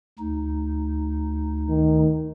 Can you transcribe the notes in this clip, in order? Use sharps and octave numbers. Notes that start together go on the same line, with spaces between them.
D2 D#4
D#3